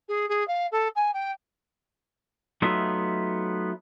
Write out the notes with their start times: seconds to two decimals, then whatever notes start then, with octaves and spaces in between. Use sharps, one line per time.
0.08 G#4
0.29 G#4
0.47 F5
0.72 A4
0.95 G#5
1.13 G5
2.62 F#3 A3 B3 D#4 F4 E5